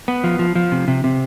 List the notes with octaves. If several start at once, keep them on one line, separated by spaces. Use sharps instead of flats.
B3
F3
F3
F3
C3
C3
C3